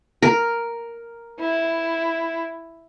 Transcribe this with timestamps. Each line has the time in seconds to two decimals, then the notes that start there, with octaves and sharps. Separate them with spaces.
0.22 A#4
1.39 E4